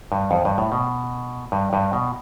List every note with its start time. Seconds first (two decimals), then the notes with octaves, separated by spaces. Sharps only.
0.12 G2
0.31 F2
0.45 G2
0.58 A2
0.72 B2
1.52 G2
1.73 G2
1.93 B2